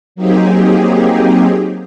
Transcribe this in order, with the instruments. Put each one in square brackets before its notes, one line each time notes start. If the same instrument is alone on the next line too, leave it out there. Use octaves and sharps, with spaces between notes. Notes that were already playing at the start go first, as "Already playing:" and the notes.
[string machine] F#3 A#3 C4 D#4 G4 G#4